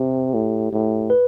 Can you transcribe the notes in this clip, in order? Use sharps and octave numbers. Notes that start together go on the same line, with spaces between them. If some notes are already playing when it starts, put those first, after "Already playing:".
Already playing: C3 G4
A2
A2
B4